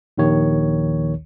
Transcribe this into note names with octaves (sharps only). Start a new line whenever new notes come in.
A#1 D#2 D#3 C#5